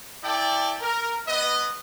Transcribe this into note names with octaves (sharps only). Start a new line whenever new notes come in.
E4 A4 D5 G5 A5
A#4
B3 B4 D#5